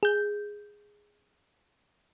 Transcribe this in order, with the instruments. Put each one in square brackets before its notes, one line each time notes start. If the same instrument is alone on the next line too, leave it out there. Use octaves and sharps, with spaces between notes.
[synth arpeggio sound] G#4 G6